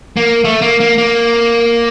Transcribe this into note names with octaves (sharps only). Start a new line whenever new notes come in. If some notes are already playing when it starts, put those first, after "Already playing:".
A#3
A3
A#3
A#3
A#3